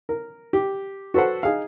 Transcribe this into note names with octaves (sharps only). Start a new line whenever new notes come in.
A#4
G4
F#4 A4 B4 C5 F#5
D#4 G#4 F5